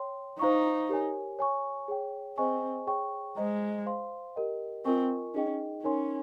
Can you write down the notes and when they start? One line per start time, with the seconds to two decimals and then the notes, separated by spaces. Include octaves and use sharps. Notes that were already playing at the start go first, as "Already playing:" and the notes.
Already playing: C#5 G5 C6
0.39 D#4 C5 F5 A#5 C#6
0.89 G4 A#4 C#5 G#5
1.39 C#5 G#5 C#6
1.88 G#4 C#5 G5
2.37 C4 G#4 C5 D#5 G#5 C#6
2.87 G#4 C#5 G5 C#6
3.37 G#3 C5 D#5 A#5
3.86 C5 F5 C6
4.35 G4 A#4 D#5 G5
4.85 C4 F4 A#4 D#5 G#5 C#6
5.34 C#4 D#4 G#4 D#5 G5
5.83 C#4 D#4 A#4 C#5 G#5 C6